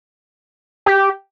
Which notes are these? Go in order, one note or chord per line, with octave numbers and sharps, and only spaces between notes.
G4